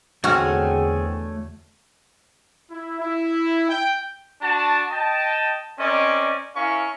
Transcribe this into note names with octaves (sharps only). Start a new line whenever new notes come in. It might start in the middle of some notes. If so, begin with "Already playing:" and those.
E2 D3 A3 C4 F#4 G#4 C#5 F6
E4
E4
G5
D4 F#4 A5
D#5 G5 A5
C4 C#4 A#4 D5 D#5
C#4 E4 A#4 F5 C#6